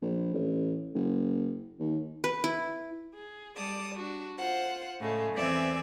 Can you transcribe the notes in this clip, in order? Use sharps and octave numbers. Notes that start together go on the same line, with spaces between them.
A#1
A1
F#1
D#2
B4
E4
G#4
G3 D5 A5 D#6
D4 F#4
F4 C5 F#5
A2 C#3 G#3 A3
E2 E3 C4 D5 E5 G#5